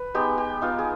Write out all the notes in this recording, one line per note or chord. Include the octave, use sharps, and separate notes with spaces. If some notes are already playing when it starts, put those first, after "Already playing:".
Already playing: B4
G#3 B3 D#4 G4
G4
B3 D#4 F4
G#4